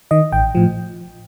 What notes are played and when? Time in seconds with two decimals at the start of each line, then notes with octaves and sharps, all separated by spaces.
0.11 D#3 D#5
0.32 A1 G5
0.55 A2 F3